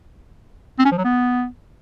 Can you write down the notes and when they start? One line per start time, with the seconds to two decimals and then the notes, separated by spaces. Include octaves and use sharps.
0.79 C4
0.85 C#4
0.92 F3
0.98 F#3
1.04 B3